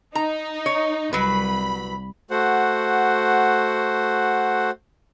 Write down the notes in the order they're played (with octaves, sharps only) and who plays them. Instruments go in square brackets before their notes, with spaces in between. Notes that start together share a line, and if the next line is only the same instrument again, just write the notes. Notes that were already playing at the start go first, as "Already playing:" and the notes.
[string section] D#4 [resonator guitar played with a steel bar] A#5
[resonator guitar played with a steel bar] C#5
[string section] C2 B5 [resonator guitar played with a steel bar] F#3 B4
[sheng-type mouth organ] A3 F#4 C5 F#5